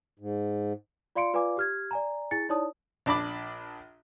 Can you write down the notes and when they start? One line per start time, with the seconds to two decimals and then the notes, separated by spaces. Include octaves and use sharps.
0.19 G#2
1.16 F4 D5 F5 C6 C#7 D7
1.33 F4 B4 D5 F5 G#5 D6
1.57 G4 F6 G#6
1.91 D5 G#5 A#5
2.31 E4 G#4 G#5 A6 C#7
2.49 D#4 E4 C#5 D5 A5 D#6
3.06 A#1 D4 B5 D6